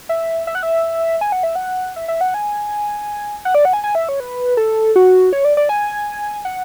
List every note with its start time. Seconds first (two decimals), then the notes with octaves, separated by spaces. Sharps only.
0.09 E5
0.47 E5
0.55 F#5
0.63 E5
1.21 G#5
1.32 F#5
1.43 E5
1.55 F#5
1.96 E5
2.08 E5
2.21 F#5
2.34 G#5
3.45 F#5
3.55 D5
3.65 F#5
3.73 G#5
3.84 G#5
3.95 E5
4.09 C#5
4.20 B4
4.57 A4
4.96 F#4
5.33 C#5
5.45 D5
5.57 D5
5.69 G#5
6.45 F#5